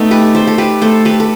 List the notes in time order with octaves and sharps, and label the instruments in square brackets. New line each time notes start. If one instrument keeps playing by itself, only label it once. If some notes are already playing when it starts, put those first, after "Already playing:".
Already playing: [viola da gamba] A3 [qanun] B3 D#4
[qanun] G4 B4
A4 C5
A4
G4 B4
[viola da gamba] A3 [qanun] A4 C5
[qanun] G4 B4
A4